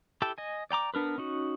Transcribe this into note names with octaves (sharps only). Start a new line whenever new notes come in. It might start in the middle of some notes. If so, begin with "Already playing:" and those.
E4 G4 A4 G5 A5
D#5 G#5
D5 G5 A#5 D6
B3 D4 A#4 B4
C#4 D#4 F#4